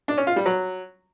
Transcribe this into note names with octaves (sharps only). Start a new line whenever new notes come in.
D4
C#4
F4
G3
F#3